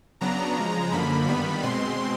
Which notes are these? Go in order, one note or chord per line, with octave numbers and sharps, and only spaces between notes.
C#3 F#3 B3 D4 A#5
C#3 F3 G#3
F#2 D3 F3 A#3 B5
G2 D#3 G3 B3 B5
B2 G#3 C4 C6